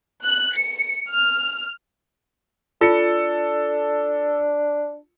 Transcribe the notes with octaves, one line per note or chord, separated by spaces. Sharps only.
F#6
C#7
F6
D4 F4 A4 C#7